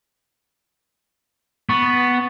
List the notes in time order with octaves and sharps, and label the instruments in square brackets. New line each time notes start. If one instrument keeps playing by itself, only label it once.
[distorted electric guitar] B3 [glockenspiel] C#6 A6